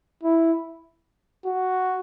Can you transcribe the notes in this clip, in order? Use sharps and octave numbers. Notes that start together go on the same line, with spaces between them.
E4
F#4